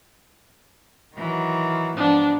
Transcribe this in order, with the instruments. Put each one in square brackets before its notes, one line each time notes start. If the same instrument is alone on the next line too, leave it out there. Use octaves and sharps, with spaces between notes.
[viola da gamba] D#3 E3 F#3
[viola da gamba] G#2 F3 B3 [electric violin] D4